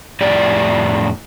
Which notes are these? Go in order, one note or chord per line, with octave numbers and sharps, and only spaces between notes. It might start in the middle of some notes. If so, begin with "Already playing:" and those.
F2 A2 G4 G#4 D5